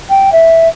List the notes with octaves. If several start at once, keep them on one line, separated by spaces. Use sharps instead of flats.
G5
E5